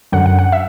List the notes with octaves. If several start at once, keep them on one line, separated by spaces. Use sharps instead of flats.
F#2 D3 F#3 F#5
F#5
F#5
E5